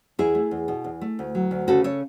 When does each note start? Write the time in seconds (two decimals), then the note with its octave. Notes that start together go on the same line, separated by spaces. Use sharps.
0.19 E2 E4 G#4
0.35 A3
0.51 E2
0.68 B2
0.84 E2
1.01 A3
1.19 D2
1.35 F#3
1.51 D2
1.67 C#3 F#4 A4
1.84 A4 C#5